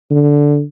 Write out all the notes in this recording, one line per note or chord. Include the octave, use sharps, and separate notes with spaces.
D3